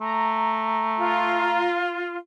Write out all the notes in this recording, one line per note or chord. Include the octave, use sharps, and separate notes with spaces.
A3 A#5
F4